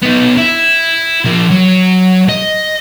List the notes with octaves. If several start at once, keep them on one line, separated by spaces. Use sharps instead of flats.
B3 D#4
E4
F3 A#3
F#3
D#5